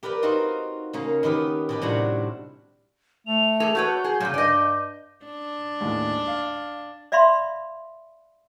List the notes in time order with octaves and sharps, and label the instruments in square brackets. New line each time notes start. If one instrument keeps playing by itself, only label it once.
[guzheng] G4 A#4 B4 D5 G5
C4 D#4 F4 F#4
C#3 A#3 C#4
D#3 B3 G4 B4
B2 G4 B4
A2 C3 G3 D4 F#4 F#5
[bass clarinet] A3 [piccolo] F7
[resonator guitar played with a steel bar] G#4 A4
[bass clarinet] F#4 [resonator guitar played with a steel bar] A4 B4 C#5 [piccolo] G6
[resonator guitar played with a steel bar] G#4
[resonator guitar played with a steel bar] A#2 C#3 [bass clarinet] F#3
[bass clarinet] G2 [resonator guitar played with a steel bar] D5 D#5
[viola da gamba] D4
[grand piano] D#2 A2 G#3
F5
[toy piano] D5 E5 F5 B5 C6